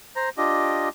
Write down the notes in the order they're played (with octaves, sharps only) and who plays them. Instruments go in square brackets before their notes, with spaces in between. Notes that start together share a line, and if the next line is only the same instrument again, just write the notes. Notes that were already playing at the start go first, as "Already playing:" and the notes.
[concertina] C5 A#5
D4 F4 G4 D#5